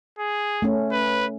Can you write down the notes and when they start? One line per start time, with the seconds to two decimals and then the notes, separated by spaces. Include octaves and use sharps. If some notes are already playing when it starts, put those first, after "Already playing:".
0.19 G#4
0.62 A3 C#4
0.92 B4